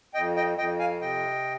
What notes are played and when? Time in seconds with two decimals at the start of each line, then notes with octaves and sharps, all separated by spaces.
0.14 F2 D#5 G5
0.36 D#5 G5
0.58 F2 D#5 G5
0.79 F5 G#5
1.01 C3 D#5 G5